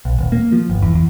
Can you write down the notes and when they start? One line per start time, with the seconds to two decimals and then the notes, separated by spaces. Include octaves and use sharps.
0.05 B1
0.19 D#1
0.32 A#3
0.52 F3
0.70 G1
0.82 E2
0.95 E2